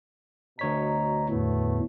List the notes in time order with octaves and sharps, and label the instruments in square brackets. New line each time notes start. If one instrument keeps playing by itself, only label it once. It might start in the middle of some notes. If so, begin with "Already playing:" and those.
[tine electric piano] D2 C#5 B6 [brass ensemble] B2 D#5 A#5
[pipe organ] E2 A2 [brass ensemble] A3 B3